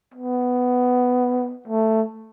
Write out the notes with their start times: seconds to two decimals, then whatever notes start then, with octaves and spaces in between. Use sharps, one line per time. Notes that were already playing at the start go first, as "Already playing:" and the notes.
0.14 B3
1.68 A3